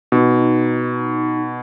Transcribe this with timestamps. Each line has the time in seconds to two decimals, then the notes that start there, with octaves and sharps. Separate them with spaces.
0.12 B2 D#4